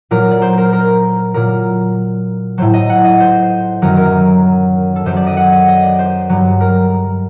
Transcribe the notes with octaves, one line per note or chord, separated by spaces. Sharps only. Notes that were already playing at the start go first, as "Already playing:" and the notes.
A#2 F#3 A#4
D5
C5
A#4
A#4
A#2 F#3 A#4
A2 F#3 C5
D#5
F#5
D#5
C5
F#2 D#3 F#3 A#4
A#4
A4
F#2 F#3 C5
D5
D#5
F#5
D#5
D#5
D5
C5
G2 F#3
A#4